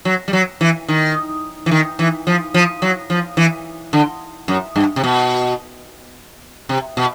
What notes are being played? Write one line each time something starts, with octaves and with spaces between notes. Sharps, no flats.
F#3
G3
F#3
E3
D#3
E3
D#3
E3
F3
F3
F#3
F3
E3
D3
F#2
G2
C3
B2
C3
B2